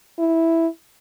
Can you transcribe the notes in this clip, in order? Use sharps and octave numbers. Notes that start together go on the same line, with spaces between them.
E4